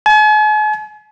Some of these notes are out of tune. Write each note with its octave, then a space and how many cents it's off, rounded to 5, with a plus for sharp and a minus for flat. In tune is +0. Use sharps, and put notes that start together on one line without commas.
G#5 +45